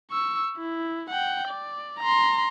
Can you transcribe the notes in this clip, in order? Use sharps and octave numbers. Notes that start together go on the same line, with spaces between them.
C#6 E6
E4
F#5 G5
D5
A#5 C6